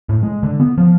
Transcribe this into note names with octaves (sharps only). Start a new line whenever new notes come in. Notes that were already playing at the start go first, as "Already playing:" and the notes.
A2
G#3
D3
B3
F3